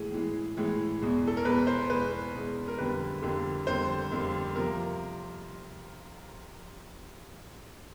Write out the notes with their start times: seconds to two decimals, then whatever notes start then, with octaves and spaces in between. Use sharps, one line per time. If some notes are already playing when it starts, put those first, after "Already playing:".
Already playing: A2 E3 G#3 G#4
0.12 A2 E3 G#3
0.57 A2 E3 G#3
1.01 E2 B2 G#3
1.28 A4
1.37 A#4
1.45 E2 B2 G#3 B4
1.67 C5
1.90 E2 B2 G#3 B4
2.34 E2 B2 G#3
2.68 A#4
2.78 F2 D3 G3 A#3 B4
3.22 F2 D3 G3 A#3
3.67 F2 D3 G3 A#3 C5
4.11 F2 D3 G3 A#3
4.56 C3 F3 A#3 A#4